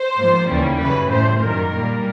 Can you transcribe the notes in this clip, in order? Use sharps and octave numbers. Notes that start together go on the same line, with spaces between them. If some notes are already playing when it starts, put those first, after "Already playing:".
Already playing: C5
G#2 F3 A#3
D#2 C#3 E3 G3 A#3
F#2 C#3 E3 B4
A2 E3 G3 C5
F#2 D#3 G3 A#3 A#4
A#2 G3 A#3